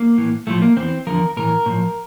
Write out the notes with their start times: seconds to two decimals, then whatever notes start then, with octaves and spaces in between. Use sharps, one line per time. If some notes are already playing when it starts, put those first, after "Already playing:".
Already playing: A#3
0.18 A2 E3
0.47 A2 F3 A3
0.62 A#3
0.77 E2 E3 C4
1.07 E2 D3 F3 A#4
1.37 A2 E3 A#4
1.66 A2 F3